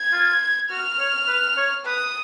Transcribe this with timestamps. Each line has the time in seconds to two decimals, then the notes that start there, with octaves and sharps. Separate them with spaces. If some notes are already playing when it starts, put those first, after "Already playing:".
Already playing: G#6
0.13 F4
0.70 F#4 F6
0.99 C#5
1.28 B4
1.57 C#5
1.86 B4 D#6